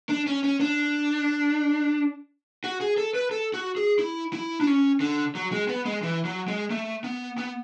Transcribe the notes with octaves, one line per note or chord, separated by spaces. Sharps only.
D4
C#4
C#4
D4
F#4
G#4
A4
B4
A4
F#4
G#4
E4
E4
D4
C#4
D3
F#3
G#3
B3
G#3
E3
F#3
G#3
A3
B3
B3